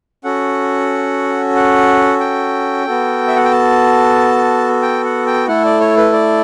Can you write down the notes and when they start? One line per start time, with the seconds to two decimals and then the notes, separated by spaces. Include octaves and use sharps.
0.24 C#4 F#4 A4 F#5
1.56 F#5
2.20 G5
2.86 B3 F#4 A4
3.28 E5
3.36 F#5
3.44 G5
3.51 A5
4.82 G5
5.05 F#5
5.26 G5
5.48 A3 E4 A4 F#5
5.65 D5
5.80 C#5
5.97 B4
6.13 D5